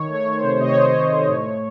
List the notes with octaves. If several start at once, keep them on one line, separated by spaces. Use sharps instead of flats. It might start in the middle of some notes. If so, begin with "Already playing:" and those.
Already playing: D#3 C#5
A3
C#5
D#3
C5
C3
C3 D#5
C#5
A3 C5
C#5
C3
A3
A2
A2